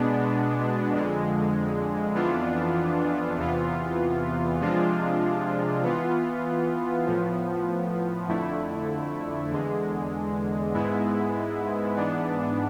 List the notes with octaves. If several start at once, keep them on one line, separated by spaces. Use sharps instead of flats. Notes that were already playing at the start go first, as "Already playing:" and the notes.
Already playing: B2 G#3 B3 D4
F2 D3 G#3
F2 E3 B3 D4 F4
E2 C3 E3 B3 F4
C3 F3 G#3 D4 F4
E3 B3 F4
A2 F3 B3
F2 D3 A3 E4
E2 D3 G#3
G#2 G#3 B3 E4
G#2 E3 B3 D4